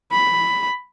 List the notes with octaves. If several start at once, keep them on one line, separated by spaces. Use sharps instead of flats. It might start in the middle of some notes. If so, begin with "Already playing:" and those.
B5